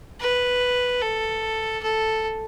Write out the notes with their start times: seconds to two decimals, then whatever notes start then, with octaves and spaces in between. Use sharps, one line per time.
0.20 B4
1.01 A4
1.83 A4